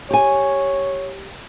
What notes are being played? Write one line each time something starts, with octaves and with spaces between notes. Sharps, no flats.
G4 C#5 G#5